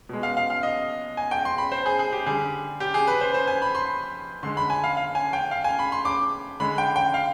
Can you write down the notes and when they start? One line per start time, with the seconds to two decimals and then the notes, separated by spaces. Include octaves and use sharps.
0.09 B2 G#3
0.23 F5
0.37 F5
0.50 F5
0.63 D#5
1.17 G#5
1.31 G5
1.45 C6
1.58 B5
1.72 C5
1.86 G#4
1.99 G#4
2.12 G4
2.26 D3 G3 G#4
2.80 G4
2.94 G#4
3.07 B4
3.21 C5
3.34 C5
3.48 G#5
3.62 B5
3.75 C6
4.43 D3 G#3 C6
4.57 B5
4.70 G#5
4.84 F5
4.97 F5
5.15 G#5
5.33 G5
5.51 F5
5.64 G#5
5.79 B5
5.92 C6
6.05 D6
6.60 D3 G#3 B5
6.78 G5
6.96 G5
7.14 F5